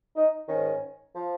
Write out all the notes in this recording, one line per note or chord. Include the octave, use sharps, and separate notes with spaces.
D#4
G#2 D#3 C#4
F3